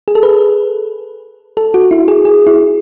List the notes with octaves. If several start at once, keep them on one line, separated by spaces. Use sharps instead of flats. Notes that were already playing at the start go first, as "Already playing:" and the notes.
G#4
A4
B4
A4
F#4
E4
G#4
G#4
E4